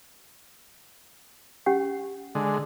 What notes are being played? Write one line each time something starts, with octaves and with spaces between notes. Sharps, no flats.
C#4 G4 F#5
D3 G#3